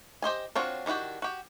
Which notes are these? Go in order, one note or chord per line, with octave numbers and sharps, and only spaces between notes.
G4 C5 D#5 G#5
C4 D4 F4 F#4 C#5
D#3 D4 E4 F#4 G4
F#4 G4